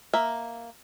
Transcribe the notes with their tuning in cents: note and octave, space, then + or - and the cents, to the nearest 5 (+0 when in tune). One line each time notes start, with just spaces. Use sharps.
A#3 +0 E5 +0